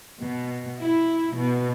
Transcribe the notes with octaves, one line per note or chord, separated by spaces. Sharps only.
B2
E4
B2